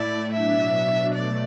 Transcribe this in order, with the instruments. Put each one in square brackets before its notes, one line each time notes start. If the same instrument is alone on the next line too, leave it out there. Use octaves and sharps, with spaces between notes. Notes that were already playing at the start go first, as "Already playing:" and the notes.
Already playing: [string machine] A2 A3 E4 [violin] D5
[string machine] B2 F#3 D4 [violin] E5
[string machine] B2 A3 [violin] D5